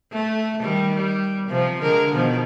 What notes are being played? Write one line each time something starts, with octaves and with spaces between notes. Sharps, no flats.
A3
D#3 G3
G3
C3 F3
D3 G#3 A#4
B2 D#3 F3